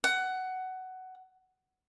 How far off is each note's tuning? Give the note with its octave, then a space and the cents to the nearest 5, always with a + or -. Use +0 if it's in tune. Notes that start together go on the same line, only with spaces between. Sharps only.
F#5 +15